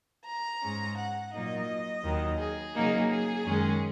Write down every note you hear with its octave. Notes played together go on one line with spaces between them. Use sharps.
A#5
G#2 G#3 C#4
F#5
A#2 F#3 A#3 D#4 D#5
D#2 D#3 F#3
G#4
C#3 F#3 A#3 D#4
G#4
F#2 D#3 G#3 C#4